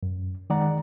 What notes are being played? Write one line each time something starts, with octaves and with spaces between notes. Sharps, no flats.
F#2
D#3 G#3 D5 F#5 A#5